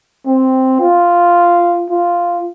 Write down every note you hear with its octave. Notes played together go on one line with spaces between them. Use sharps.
C4
F4
F4